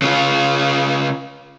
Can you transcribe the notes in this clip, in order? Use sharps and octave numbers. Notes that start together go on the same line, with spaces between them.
C#3 F4